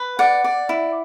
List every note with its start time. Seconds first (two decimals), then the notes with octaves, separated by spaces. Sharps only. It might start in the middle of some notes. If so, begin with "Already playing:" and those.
Already playing: B4
0.19 D5 F#5
0.44 D5
0.69 E4